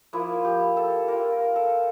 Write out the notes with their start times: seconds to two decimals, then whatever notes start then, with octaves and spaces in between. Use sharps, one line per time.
0.13 F3 A#3 E4
0.45 G4
0.77 A4
1.08 A#3 F4 A#4
1.32 A#4
1.56 A4